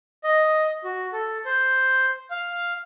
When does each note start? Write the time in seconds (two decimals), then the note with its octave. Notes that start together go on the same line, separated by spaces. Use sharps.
0.24 D#5
0.84 F#4
1.13 A4
1.46 C5
2.31 F5